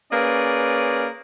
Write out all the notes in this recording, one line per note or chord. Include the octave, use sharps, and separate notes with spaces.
A#3 C#4 G#4 B4 D5